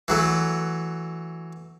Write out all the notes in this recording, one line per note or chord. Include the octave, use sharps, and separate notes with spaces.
E3 F#3 A3